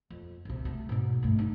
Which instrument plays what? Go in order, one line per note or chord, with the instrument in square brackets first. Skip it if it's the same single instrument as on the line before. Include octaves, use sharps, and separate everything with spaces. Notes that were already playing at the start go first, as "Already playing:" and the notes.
[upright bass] F2
C2 C3
A3
G#2 B2
G2 A3
C#3 D#4